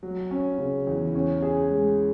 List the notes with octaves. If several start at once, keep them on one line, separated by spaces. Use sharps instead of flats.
F#3
C#4
C#3
E2
C#4
G#4
G#3